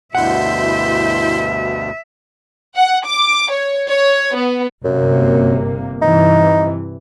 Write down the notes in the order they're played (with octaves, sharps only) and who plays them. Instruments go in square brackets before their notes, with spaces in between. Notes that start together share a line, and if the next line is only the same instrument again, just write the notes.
[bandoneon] D2 G2 B2 [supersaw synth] E4 C6 G6 [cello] E5 [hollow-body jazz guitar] F#5
[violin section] F#5
D6
C#5
C#5
B3
[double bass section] G1 C3 A#3 [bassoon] F#2
[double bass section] G2 C3 E3 [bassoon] D#4